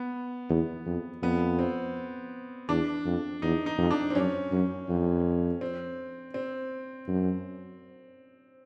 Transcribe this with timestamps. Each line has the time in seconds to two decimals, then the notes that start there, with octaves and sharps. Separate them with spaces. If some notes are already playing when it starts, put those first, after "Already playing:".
Already playing: B3
0.49 E2
0.86 F2
1.22 F2 B3
1.59 C4
2.69 E2 D4
3.05 F2
3.42 E2 D#4
3.66 D#4
3.78 F2
3.90 D4
4.10 C4
4.15 F#2 C#4
4.51 F#2
4.89 F2
5.61 C4
6.34 C4
7.08 F#2